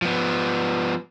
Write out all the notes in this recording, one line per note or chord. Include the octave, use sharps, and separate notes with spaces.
F3 B3